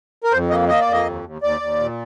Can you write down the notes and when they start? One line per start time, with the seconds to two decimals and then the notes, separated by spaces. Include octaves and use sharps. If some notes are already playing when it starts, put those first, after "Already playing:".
0.24 A#4
0.32 F2 C5
0.50 A#3 D#5
0.69 A#3 D#5
0.81 D5
0.87 F2
0.93 D#5
1.05 D#2
1.24 D#2
1.42 D#2 D5
1.61 D#2
1.79 A#2